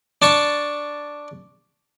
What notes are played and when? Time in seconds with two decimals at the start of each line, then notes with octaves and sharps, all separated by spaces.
0.22 D4 A5 C#6